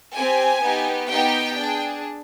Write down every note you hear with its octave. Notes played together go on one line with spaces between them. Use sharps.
C4 G4 G#5
B3 D#4 G4
B3 D#4 G4 G5
D4 G#4